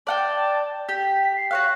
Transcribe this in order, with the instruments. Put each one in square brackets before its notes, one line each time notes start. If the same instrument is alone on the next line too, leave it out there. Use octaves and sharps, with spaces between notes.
[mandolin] D5 F#5 G5 [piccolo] A5
[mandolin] G4 [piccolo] B6
[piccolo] C7
[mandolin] F#4 C#5 F5 [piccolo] F#6